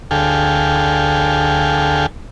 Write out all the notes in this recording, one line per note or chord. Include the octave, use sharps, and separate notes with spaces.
D2 G#4 A4 F5 G5